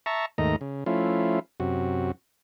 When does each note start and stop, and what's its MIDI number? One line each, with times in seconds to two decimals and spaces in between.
0.06 0.26 76
0.06 0.26 81
0.06 0.26 82
0.06 0.26 85
0.38 0.56 39
0.38 0.56 44
0.38 0.56 51
0.38 0.56 57
0.38 0.56 75
0.38 0.56 82
0.61 0.84 49
0.86 1.39 53
0.86 1.39 57
0.86 1.39 61
0.86 1.39 64
0.86 1.39 65
1.60 2.11 42
1.60 2.11 48
1.60 2.11 66